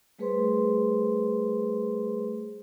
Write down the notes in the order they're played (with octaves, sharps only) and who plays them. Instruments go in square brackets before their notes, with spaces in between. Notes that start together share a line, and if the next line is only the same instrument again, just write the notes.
[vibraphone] G3 A3 G#4 B4 C5 C6